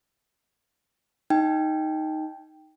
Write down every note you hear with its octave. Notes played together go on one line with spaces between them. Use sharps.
D#4 G5